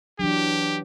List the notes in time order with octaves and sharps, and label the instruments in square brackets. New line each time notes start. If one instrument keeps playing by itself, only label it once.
[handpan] E3 F#3 [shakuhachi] D4 [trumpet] G4